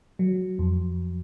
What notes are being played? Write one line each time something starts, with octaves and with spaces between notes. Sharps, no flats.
F#3
F2